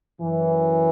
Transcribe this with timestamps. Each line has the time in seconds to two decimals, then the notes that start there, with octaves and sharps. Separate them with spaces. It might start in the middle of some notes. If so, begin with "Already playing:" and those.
0.20 F#2 E3